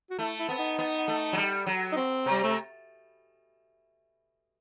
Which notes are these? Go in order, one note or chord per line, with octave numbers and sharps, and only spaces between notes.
F#4
A3 E4
E4
B3 C4
D#4
B3
A3
F#3
G3
F#3
D#4
C4
C3 G3
A3